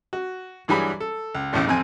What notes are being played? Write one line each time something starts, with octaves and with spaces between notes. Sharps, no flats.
F#4
G2 E3 F#3 G3 G#4 B5
A4
C#2
G#1 E2 A2 C#3
A1 F2 C4 G#5